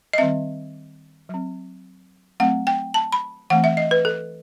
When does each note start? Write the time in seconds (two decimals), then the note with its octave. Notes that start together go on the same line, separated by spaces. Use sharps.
0.13 D#5
0.18 D#3 G3 C4 E5
1.29 F#3 C4
2.40 F#3 A3 C4 F#5
2.67 G5
2.94 A5
3.12 B5
3.50 E3 A3 C4 F#5
3.64 E5
3.77 D#5
3.91 B4
4.05 A4